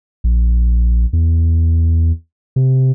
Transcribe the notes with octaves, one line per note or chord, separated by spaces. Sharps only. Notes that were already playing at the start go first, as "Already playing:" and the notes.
A#1
E2
C3